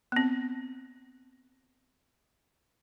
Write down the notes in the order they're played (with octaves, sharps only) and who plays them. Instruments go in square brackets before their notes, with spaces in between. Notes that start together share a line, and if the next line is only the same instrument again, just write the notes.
[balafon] B3 C4